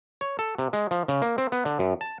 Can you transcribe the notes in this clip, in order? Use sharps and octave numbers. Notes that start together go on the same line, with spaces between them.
C#5
A4
C3
G#3
F3
C#3
A#3
C4
B3
D3
F#2
A5